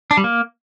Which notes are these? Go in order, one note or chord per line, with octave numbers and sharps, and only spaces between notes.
D4
G3
A#3